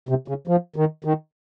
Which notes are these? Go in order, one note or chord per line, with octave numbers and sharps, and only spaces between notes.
C3
C#3
F3
D#3
D#3